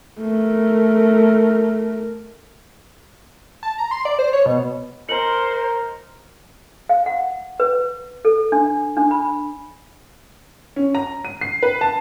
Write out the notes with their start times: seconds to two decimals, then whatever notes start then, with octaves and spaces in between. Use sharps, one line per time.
0.20 A3 A#4
3.63 A5
3.78 A#5
3.91 C6
4.05 D5
4.19 C5
4.33 C#5
4.46 B2
5.09 A#4 C5 D#5 A#5 C#7 F#7
6.89 F5
7.06 F#5
7.60 B4
8.25 A4
8.52 D4
8.97 D4
9.11 B5
10.76 C#4
10.95 A#5
11.25 D#7
11.41 C7
11.63 B4
11.81 A5